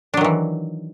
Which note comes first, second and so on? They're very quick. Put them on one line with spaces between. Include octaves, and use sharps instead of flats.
D4 F#3 D#3 E3